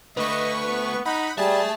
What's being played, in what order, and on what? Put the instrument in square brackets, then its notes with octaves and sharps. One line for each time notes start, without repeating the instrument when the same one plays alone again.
[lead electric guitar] D3 A3 [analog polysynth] B4 C#6 [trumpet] D#5
[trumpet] B3
[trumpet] D#4 [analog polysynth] F#5 B5
[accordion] G3 [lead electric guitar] A3 E5 [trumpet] G#4 [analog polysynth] A5